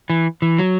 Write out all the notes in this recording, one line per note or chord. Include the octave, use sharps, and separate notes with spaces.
E3
E3
F#3